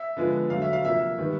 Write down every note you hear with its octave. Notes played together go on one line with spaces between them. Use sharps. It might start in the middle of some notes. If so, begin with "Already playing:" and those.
Already playing: E5
D3 F3 G#3 B3
D3 F#3 A3 F5
E5
F5
C3 F3 A#3 E5
D#3 G3 B3